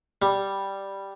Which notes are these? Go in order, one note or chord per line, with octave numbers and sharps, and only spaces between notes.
G3